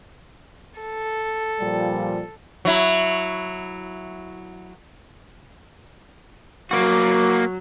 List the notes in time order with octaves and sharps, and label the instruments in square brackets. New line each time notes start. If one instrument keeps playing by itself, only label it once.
[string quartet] A4
[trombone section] A#2 F3 G3
[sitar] F#3 E4
[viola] F#3 [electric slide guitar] A#3 F#4